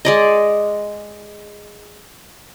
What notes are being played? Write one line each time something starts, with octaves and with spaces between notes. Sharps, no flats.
G#3 D5 D#5